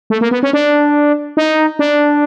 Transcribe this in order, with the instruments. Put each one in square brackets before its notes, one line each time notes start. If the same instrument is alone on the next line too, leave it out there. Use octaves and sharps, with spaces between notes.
[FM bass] A3
A#3
B3
C#4
D4
D#4
D4